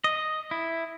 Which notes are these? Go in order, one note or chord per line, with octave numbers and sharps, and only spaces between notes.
D#5
E4